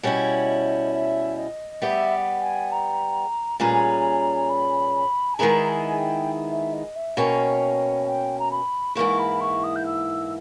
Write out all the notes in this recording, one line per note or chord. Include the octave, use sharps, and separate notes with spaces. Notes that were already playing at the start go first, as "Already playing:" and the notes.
B2 G3 C#4 E4 D#5
E5
D#5
G3 B3 G4 E5
G#5
A#5
A#2 G3 C#4 G#4 B4 A#5
B5
G#5
D#3 G#3 B3 E4 G#4 A#5
G#5
G5
E5
D#5
E5
B2 A#3 C#4 G5
G5
A#5
B5
G#2 E3 A#3 E4 C#6
B5
C#6
D#6
G6
E6